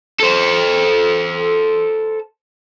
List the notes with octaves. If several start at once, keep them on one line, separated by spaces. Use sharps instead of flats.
A4 C5